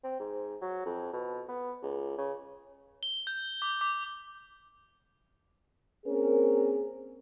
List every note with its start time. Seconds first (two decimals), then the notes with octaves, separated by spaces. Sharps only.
0.04 C4
0.19 G#2
0.61 F#3
0.86 F2
1.13 B2
1.49 B3
1.82 C#2
2.18 C#3
3.03 G7
3.27 G6
3.62 D6
3.81 D6
6.06 A#3 C4 C#4 G#4 A#4